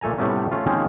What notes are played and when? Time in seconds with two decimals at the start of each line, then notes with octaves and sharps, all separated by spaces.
0.01 A#2 A3 A4 G#5 A#5
0.18 A2 C3 G3 A3 B3 C#4
0.51 A3 C#4 F4
0.66 D#3 F3 G#3 A#3 C4 C#4